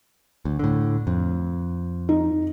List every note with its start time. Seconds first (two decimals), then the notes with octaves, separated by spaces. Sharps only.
0.45 D2
0.59 A2 D3
1.07 F2
2.09 D#4